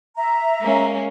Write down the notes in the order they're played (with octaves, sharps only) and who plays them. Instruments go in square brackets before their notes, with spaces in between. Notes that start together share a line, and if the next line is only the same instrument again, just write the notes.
[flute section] E5 A#5
[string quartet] G#3 A#3 C#4